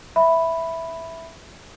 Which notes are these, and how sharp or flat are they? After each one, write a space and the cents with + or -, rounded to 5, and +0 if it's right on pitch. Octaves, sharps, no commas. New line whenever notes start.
E5 -5 B5 +0